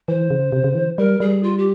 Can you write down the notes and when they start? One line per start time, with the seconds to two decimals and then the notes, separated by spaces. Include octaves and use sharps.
0.08 E3 C5
0.30 C#3
0.52 C3
0.64 C#3
0.75 E3
0.98 G3 A#4
1.20 G3 G#4
1.43 F4
1.58 G4